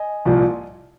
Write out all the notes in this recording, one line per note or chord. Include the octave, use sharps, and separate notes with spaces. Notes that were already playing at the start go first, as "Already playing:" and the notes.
Already playing: D#5 G#5
C2 A#2 F3